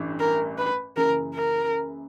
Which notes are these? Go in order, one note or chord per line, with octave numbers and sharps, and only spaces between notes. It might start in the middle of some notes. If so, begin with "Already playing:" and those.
Already playing: A1 G2 E3
A#4
B4
F#1 F#2 C#3 E3 A#4
A#4